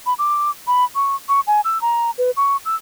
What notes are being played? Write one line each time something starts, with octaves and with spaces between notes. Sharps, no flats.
B5
D6
B5
C#6
C#6
G#5
E6
A#5
B4
C#6
E6